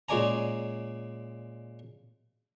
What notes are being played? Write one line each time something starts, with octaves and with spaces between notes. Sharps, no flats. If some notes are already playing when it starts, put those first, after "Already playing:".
A#2 G#3 C#4 D5 G#5 A#5